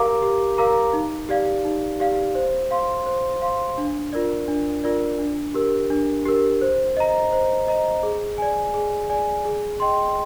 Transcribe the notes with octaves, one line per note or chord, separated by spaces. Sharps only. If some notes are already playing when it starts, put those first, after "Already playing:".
Already playing: G4 A#4 F5 A#5 D6
G4
A#4 F5 A#5 D6
D#4
G4 D5 F5
D#4
G4 D5 F5
C5
F5 C6
C5
F5 C6
D4
F4 A#4 D5
D4
F4 A#4 D5
D4
G4 A#4
D4
G4 A#4
C5
D#5 A#5
C5
D#5 A#5
G#4
D5 G#5
G#4
D5 G#5
G#4
D#5 G5 C6